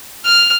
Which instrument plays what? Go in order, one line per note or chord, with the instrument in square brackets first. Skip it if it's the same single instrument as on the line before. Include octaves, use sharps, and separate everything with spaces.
[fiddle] F6